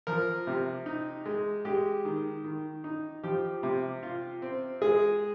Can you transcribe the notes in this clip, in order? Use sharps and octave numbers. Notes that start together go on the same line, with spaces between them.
F3 A#4
C3
D#4
G#3
G#3 G4
D#3
D#3
D#4
F3 G4
C3
F4
C4
G#3 G#4